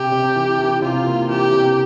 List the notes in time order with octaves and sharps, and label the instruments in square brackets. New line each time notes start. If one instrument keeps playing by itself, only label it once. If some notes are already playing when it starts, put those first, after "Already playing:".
Already playing: [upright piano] C3 [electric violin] G4
[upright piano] C3
E3
E3
[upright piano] C3 [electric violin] F4
[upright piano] A#3
[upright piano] E3 [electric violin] G4
[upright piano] C3